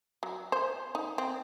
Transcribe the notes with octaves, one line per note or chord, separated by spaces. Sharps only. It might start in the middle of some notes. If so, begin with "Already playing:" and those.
F#3
C5
D#4
C4